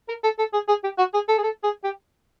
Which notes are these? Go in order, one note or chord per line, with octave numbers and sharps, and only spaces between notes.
A#4
A4
A4
G#4
G#4
G4
F#4
G#4
A4
G#4
A4
G#4
G4